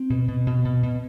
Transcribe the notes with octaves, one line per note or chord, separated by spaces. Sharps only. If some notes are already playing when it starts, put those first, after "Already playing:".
Already playing: C4
B2
B2
B2
B2
B2